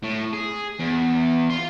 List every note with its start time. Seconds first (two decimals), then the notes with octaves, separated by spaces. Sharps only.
0.03 A2
0.33 G#4
0.80 E2
1.50 F5 C6